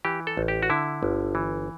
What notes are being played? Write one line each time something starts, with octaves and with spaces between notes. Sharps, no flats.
E3 G4
A4
A1
G4
F#4
D3 E4
G1
E3